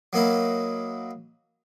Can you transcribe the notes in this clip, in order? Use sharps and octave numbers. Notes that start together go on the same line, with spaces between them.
F#3 A#3 D#4 E4